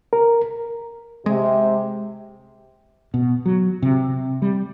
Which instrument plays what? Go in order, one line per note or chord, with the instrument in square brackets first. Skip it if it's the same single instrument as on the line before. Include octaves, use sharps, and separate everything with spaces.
[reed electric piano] A#4
[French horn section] C3 [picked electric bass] G#3
[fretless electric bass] B2
F#3
C3
G3